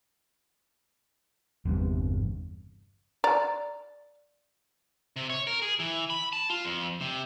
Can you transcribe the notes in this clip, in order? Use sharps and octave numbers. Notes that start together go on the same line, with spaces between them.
G1 E2 G2 C3
D5 A#5
C3
C#5
A#4
G#4
E3
B5
A5
F4
F2
C3